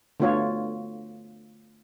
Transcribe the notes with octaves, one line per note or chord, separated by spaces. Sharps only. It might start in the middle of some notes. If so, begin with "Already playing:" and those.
D3 A3 B3 F4 F#4 C#5